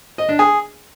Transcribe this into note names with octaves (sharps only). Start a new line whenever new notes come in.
D#5
D4
G#4